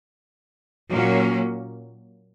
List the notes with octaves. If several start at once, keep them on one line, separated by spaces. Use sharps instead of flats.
A#2 F#3 A#3 C#4